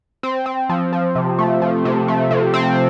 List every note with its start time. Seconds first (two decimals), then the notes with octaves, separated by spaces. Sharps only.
0.23 C4
0.46 C4
0.69 F3
0.93 F3
1.15 C3
1.38 A3
1.62 F3
1.85 C3
2.08 A3
2.31 C3
2.54 C4